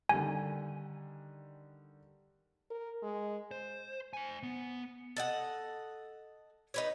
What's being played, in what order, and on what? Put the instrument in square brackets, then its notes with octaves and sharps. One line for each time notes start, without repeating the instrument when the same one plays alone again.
[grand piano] D3 D#3 G3 [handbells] G#5
[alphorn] A#4
G#3
[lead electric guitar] C5
C5 G#5
B3
[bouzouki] A4 D#5 F#5
D#4 B4 C#5